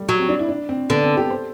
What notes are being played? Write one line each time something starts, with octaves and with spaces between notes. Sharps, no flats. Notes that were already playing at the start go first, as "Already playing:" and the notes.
Already playing: G3 A3
F#3
C4
D4
E4
D4
C4
D3 B3
C4
G4
C5